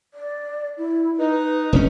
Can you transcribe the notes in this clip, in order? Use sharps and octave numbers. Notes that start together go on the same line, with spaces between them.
D5
E4
D#4 B4
B4
F1 A#2 C#4